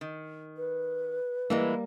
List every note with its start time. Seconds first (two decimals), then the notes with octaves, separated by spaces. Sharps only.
0.01 D#3
0.57 B4
1.50 E3 G3 G#3 A#3 E4